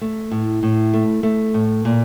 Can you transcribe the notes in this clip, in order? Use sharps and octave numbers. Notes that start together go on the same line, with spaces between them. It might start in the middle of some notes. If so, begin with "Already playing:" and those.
A3
A2
A2
A3
A3
A2
A#2